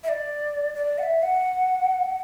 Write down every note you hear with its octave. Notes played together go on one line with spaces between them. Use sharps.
E5
D5
D5
F#5
E5
F#5